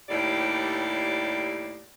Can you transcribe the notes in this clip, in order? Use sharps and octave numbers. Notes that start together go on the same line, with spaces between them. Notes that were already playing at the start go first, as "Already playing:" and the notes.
D#2 A2 G3 D5